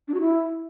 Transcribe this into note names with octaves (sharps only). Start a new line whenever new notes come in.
D4
F#4
E4